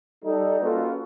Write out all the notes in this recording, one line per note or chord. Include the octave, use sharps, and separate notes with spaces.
G3 D#4 A4
A#3 C#4 F4 F#4 A4 B4